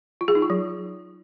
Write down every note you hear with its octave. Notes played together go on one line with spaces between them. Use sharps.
F4
G#4
D#4
F4
F#3